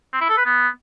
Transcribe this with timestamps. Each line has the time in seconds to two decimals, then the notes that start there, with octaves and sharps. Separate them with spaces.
0.13 C4
0.21 E4
0.29 A4
0.38 B4
0.46 B3